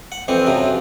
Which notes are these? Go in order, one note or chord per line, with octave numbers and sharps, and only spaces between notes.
F#5
F2 E3 C4
F#2 C3 F3